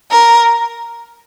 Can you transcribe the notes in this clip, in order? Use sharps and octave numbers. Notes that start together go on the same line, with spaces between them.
A#4